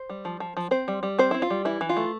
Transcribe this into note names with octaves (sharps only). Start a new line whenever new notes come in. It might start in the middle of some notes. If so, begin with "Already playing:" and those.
Already playing: C5
G3
F3
F3
F3
C4 C5
G3
G3
C4 C5
C4 E4
F4
G3
E3 E4
E3
F4
A3